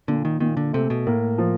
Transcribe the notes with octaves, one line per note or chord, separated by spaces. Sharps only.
A#2 D3
D#3
A#2 D#3
D3
C3 A3
B2
A2 A#3
F3